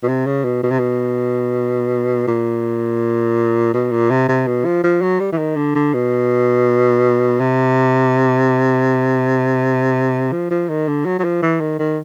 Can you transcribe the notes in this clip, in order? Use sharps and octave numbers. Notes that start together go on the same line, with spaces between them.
B2
C3
C#3
B2
B2
C3
B2
A#2
B2
A#2
C3
C3
B2
F3
F3
F#3
G3
E3
D#3
D3
D3
B2
C3
F3
F3
D#3
D3
F#3
F#3
F3
E3
D#3
D#3